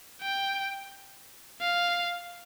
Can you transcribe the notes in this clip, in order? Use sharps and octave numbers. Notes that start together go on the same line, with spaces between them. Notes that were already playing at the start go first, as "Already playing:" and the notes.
G5
F5